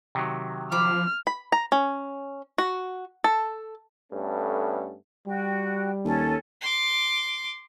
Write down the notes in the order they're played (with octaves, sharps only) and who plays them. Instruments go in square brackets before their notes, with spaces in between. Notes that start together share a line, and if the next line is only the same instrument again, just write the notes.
[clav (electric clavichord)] C3 D#3 F#3
[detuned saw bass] F3 [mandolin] C5 B5 D6 [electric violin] F6
[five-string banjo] B5
A#5
C#4
F#4
A4
[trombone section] G2 A3 B3 C#4 A4
[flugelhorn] G3 [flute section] F#4 G5
[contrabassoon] D#2 [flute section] C#4 A4 G#5
[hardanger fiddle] C6 D6